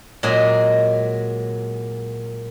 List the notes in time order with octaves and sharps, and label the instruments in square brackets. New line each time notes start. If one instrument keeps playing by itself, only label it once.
[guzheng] A#2 F#3 G#3 G#4 D#5 A#5